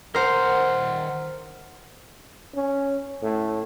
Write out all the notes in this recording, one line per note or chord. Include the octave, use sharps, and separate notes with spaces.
D#3 A#4 C5 F#5
C#4
A2